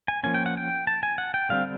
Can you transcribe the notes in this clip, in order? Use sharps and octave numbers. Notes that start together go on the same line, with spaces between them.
G#5
F3 A#3 C#4 G#5
G5
F#5
G5
A5
G#5
F#5
G5
D3 G3 C4 F5